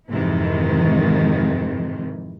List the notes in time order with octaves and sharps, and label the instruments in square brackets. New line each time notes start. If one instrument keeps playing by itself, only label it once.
[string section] F2 G#2 C3 D#3 E3